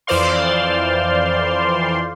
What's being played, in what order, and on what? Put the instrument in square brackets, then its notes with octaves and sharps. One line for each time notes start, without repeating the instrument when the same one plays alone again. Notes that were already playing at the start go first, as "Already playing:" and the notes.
[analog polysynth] F2 E3 C5 D5 F5 C6